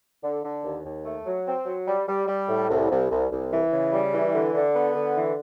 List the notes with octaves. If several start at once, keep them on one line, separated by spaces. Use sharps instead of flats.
D3
D3
D#2
D#2
A3
F#3
C4
F#3
G3
G3
G3
A2
C2
C2
C2
C2
E3
C#3
G3
E3
D3
D3
B3
D3
E3